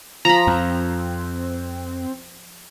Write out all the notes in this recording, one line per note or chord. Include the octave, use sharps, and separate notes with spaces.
F3 F4 A#5 B5
F2 C4